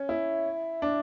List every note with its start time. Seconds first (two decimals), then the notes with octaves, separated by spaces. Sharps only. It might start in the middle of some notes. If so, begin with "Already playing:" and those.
Already playing: C#4
0.09 E4
0.82 D4